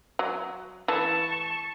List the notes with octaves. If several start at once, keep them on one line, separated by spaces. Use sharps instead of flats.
F#3
E3 A4 A5 C#6